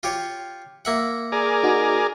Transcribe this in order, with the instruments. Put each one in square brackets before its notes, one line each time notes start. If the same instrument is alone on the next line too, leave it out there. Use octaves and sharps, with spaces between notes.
[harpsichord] F4 G4 C#5
A#3 E5 F#5
[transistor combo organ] G#4 A#4 D5
[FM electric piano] D#4 F#4